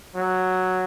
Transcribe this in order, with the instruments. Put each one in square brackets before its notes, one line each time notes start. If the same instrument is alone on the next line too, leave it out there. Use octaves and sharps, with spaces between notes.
[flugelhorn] F#3